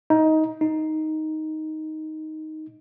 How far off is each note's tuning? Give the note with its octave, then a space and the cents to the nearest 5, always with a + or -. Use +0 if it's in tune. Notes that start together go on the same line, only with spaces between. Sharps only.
D#4 +15
D#4 +5